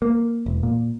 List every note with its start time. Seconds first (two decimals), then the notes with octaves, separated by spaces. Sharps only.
0.02 A#3
0.46 E1
0.63 A#2